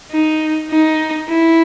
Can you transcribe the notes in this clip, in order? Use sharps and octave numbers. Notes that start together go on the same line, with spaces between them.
D#4
D#4
E4